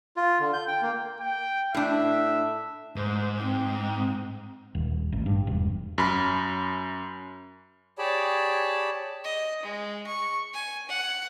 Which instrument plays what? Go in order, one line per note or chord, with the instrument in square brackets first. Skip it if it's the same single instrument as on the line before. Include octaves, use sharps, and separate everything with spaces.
[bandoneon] F4
D3
G6
G5
A#3
[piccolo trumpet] G5
[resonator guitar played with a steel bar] A2 D4 [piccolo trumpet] E5
[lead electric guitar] G#2 [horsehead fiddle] C5
[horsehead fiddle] C4
[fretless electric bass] D#1
A1
G2
E1
[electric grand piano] F#2 B5
[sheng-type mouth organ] G4 G#4 C#5 D5 A5 B5
[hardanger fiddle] D#5
G#3
C#6
G#5
F#5